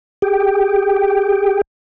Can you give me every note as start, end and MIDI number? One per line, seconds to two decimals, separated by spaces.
0.22 1.61 67
0.22 1.61 68
0.22 1.61 79